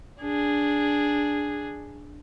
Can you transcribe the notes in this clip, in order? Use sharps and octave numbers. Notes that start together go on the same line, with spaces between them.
D4 G#4